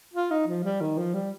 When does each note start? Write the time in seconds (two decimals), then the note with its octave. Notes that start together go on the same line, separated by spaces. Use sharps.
0.14 F4
0.31 D#4
0.47 F3
0.64 G3
0.81 D#3
0.98 F3
1.14 G3